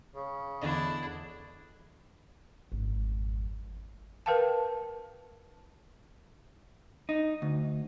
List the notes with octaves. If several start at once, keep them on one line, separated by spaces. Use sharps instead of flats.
C#3
E2 D3 D4 E4 D#5
G#1 F2
A#4 B4 F5 G5 A5
D#4
D2